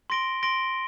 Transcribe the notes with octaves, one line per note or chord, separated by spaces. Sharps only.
C6 A#6 D7 G7
C6 A#6 D7 G7